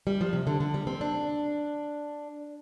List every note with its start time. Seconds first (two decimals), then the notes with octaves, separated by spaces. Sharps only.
0.07 G3
0.21 F3
0.33 C3
0.47 D3
0.60 D3
0.74 G3
0.87 C4
1.01 D4